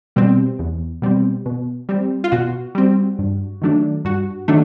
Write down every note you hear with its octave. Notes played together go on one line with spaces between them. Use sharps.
B2 G3 C4
E2
B2 G3 C4
B2
G3 C4
F4
B2 F#4
G3 C4
G2
D#3 F#3 A3 D4
G2 F#4
D#3 F#3 A3 D4